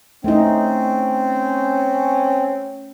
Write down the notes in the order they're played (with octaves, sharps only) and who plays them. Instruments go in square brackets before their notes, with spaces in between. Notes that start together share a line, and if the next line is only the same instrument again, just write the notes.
[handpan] A3 D#4 [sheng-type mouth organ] C4 [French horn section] C#4